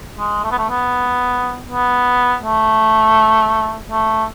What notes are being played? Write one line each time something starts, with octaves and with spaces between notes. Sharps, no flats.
G#3
A3
B3
A3
B3
B3
A3
A3